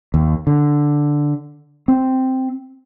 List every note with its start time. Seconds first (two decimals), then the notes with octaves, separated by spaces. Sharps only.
0.14 D#2
0.47 D3
1.88 C4